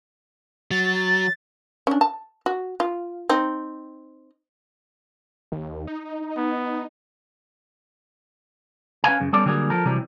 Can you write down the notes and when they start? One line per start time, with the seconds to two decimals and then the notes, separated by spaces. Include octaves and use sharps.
0.71 F#3 A6
1.87 C#4 D4
2.01 A5
2.46 F#4
2.80 F4
3.29 C4 D#4
5.52 D#2
5.87 D#4
6.37 B3
9.04 C#4 B4 F5 G#5
9.20 F#2 C#3
9.33 G3 B3 C#4 A4 D5
9.46 D3 F#3 G3 A#3 G#4
9.70 F3 A4 A#4
9.85 C3 E3 F#3 G3